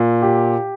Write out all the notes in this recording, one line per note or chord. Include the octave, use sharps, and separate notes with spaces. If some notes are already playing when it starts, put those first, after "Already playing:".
Already playing: A#2
G4